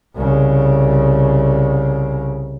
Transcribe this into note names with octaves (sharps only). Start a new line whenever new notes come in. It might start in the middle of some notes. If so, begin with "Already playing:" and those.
C2 C#3